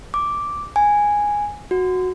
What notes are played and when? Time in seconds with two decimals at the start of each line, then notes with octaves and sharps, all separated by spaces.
0.14 D6
0.76 G#5
1.71 F#4